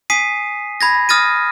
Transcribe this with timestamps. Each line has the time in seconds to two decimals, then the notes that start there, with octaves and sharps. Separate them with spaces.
0.10 G#5 D#6 B6 C7 D#7
0.81 B5 G#6 A#6
1.09 D#6 F6 A6 A#6 D#7